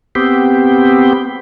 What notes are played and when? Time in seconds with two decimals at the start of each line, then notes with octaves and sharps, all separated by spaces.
0.15 B3 C4 G4